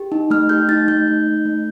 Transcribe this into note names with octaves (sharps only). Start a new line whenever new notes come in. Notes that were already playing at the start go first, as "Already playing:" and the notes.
Already playing: G4
D#4
A3 F6
G4 G6
D#4 A6
A3 G6
D#4
A3
A3